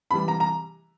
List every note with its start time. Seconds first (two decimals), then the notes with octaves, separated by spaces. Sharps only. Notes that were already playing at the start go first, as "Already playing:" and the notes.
0.11 C3 E3 G3 B5
0.28 A#5
0.40 A#5